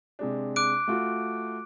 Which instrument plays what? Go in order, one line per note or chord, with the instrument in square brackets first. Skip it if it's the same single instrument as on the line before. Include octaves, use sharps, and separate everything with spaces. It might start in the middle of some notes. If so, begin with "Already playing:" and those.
[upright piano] C3 G#3 D4
[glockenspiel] D6 F#6 D7
[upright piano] A3 F4 F#4